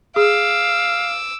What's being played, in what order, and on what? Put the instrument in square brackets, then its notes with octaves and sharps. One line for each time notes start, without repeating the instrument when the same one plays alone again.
[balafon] G#4 [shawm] F5 [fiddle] D6 E6